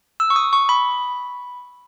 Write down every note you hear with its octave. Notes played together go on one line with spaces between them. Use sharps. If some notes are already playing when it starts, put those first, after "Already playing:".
E6
C#6
D#6
C#6
B5